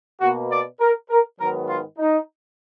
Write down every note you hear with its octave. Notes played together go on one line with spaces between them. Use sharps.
B2 A#3 F#4
D5
A#4
A#4
G#2 D#3 F#3 B3 A#4
F4
D#4